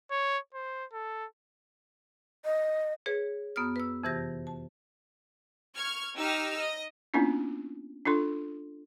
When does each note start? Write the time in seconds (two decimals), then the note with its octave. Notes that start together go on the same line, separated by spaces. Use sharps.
0.11 C#5
0.54 C5
0.93 A4
2.45 D#5
3.06 G#4 B4 C#5
3.56 F#2 B3 D#6 F6
3.76 B4 E6
4.04 F2 C3 E3 G4 A#6
4.47 A5
5.76 C#6 F6 G#6
6.16 D#4 G4 E6 F6
6.57 D#5
7.14 A#3 B3 C#4 D4 E4 F4
8.05 D4 F4 A4 C6